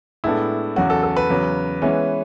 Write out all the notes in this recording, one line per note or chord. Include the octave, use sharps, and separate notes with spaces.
A2 G#3 B3 D4 E4 A4
E2 C#3 F#3 F#4
A4
A4
B4
E2 C#3 F#3
E3 G#3 B3 C#4 E4